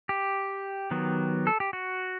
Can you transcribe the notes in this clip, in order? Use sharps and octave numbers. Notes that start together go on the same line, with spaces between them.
G4
D#3 F#3 B3
A4
G4
F#4